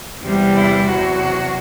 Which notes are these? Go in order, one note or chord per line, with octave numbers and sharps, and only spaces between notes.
E2 C3 G3
E4
E2 C3 F#3 F#4